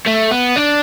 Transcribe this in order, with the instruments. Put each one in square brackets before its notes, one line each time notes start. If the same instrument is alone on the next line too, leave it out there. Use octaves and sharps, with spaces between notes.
[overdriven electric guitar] A3
B3
D4